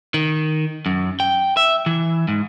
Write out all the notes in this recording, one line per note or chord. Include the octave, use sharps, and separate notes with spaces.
D#3
F#2
G5
E5
E3
G#2